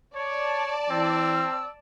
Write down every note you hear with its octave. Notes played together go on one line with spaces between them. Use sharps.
C#5 D5 A5
E3 C4 E6